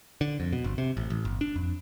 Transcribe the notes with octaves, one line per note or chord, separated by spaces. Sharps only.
D3
F2
B2
G1
C3
A1
A1
G1
D4
F2